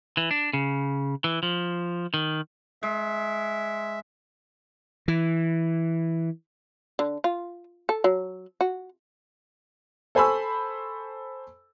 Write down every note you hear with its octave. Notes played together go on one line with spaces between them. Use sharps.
E3
D4
C#3
E3
F3
D#3
G#3 E5
E3
D3
F4
A4
F#3
F#4
A4 C5 G#5 B5 C#6 E6